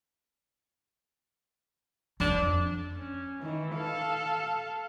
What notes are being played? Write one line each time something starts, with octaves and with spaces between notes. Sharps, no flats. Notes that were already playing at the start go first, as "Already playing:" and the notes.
F2 D4
C#4
D#3 E3
A4 F5